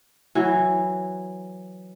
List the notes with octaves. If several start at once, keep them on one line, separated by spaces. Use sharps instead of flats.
E3 F#3